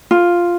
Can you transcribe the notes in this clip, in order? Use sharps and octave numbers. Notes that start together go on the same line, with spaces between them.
F4